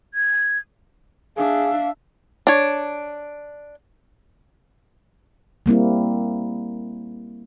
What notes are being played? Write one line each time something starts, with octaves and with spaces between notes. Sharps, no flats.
G#6
D4 G#4 E5 F5
D4 C#5
G3 A#3 C4 E4